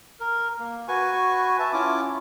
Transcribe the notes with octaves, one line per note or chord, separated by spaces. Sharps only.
A#4
A#3
F#4 B4 G#5 C#6
E5 A5
C#4 E4 F4 D6